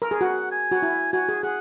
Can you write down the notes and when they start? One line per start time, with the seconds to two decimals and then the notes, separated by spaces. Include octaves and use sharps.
0.02 A#4
0.11 G#4
0.21 F#4 F#5
0.51 G#5
0.72 F#4
0.82 E4
1.13 F#4 G#5
1.29 G#4
1.43 G#4 F#5